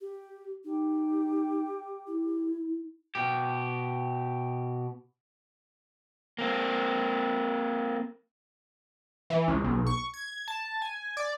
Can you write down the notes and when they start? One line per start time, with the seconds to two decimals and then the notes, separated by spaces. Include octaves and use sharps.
0.01 G4
0.65 D#4 G4
2.07 E4
3.15 B2 G4
6.38 A#3 C4
9.30 E3
9.48 C#2
9.64 B1
9.87 C#6
10.14 G#6
10.48 A5
10.82 G#5
11.17 D5